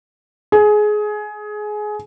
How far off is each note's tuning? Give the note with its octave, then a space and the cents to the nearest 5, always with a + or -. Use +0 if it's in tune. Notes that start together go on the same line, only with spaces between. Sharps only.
G#4 +20